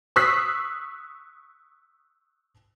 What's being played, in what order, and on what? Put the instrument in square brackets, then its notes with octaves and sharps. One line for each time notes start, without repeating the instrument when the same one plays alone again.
[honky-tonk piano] C#6 D#6 E6 F#6 B6 C7